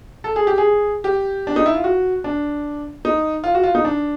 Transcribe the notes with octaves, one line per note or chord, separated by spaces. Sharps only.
A4
G#4
G4
G#4
G4
D4
D#4
E4
F4
F#4
D4
D#4
F4
F#4
F4
D#4
D4